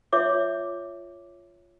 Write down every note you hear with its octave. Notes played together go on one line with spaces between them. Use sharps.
F4 C#5 E5 D6